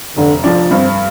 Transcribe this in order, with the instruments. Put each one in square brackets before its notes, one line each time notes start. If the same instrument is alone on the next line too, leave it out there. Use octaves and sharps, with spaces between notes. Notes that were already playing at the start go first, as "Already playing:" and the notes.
[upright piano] F1 [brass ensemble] D3
[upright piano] F2 F3 D4
[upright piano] G2 [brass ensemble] C4